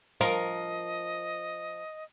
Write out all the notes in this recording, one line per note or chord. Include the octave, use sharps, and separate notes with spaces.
F3 A#4 D#5